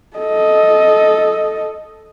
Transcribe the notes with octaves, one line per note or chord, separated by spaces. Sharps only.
A4 D#5